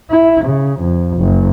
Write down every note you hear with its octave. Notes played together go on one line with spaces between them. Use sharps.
E4
C#3
F2
F#1